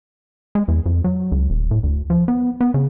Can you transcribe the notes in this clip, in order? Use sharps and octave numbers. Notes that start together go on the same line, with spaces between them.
G#3
E2
F2
F#3
C#2
D#1
A2
D2
F3
B3
B3
C#3